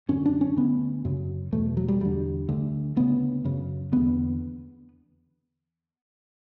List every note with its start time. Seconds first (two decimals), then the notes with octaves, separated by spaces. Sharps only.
0.09 F#2 D3 C#4
0.26 D4
0.41 C#4
0.56 D2 D3 B3
1.05 F#2 C#3
1.52 E2 B2 A3
1.77 F#3
1.88 G3
2.00 E2 D3 G3
2.49 D2 D3
2.96 D2 C#3 B3
3.45 F#2 C#3
3.92 E2 D3 B3